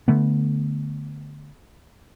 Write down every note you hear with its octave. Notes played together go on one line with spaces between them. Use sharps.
D3 A3 B3